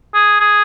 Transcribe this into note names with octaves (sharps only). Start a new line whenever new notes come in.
G#4
G#4